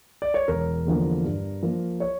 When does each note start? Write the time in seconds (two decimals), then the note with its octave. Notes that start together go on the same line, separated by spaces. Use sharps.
0.22 D5
0.34 C#5
0.48 E1 A#4
0.86 E2 D3 F3 A#3
1.24 G2
1.63 F3 A#3
2.00 C#5